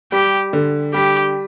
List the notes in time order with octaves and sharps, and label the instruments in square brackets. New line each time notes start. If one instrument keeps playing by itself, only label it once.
[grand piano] G3 [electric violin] G4
[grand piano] D3
[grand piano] G3 [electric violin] G4